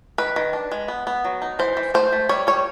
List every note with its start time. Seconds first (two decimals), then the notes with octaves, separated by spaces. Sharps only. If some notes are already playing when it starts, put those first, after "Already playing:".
0.18 D#3 B4
0.36 D#3
0.53 D4
0.71 G#3
0.88 B3
1.07 B3
1.25 F#3
1.42 D#4
1.59 E3 C5
1.77 E3
1.94 A3 C5
2.12 A3
2.29 G3 C#5
2.47 G3 C#5